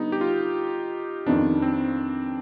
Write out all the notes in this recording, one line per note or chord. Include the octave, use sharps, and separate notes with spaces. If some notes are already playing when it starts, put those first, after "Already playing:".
Already playing: D3 G3 B3 D#4
G4
F4
F2 D#3 B3 D4 D#4
C4